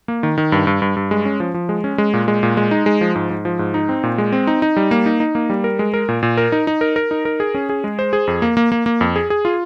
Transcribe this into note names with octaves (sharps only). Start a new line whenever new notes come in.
A#3
D#3
D#3
G2
G2
G2
G2
G#3
C#4
F3
F3
G#3
C#4
G#3
A#2
G#3
A#2
G#3
D#4
G#3
F3
G#2
G#2
F3
G#2
D#4
C4
A#2
G#3
C4
D#4
D#4
G3
A#3
D#4
D#4
A#3
G3
A#4
G#3
A#4
A#2
A#2
A#4
D#4
D#4
A#4
A#4
D#4
A#4
G#4
C#4
G#4
G#3
C5
G#4
F2
A#3
A#3
A#3
A#3
F2
G#4
G#4
F4